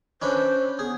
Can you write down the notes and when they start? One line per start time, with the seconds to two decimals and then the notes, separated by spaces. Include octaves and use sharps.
0.22 C#4 D4 B4 C5
0.79 B3 G#4